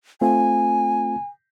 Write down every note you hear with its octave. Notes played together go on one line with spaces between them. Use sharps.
A3 C4 F4 G#5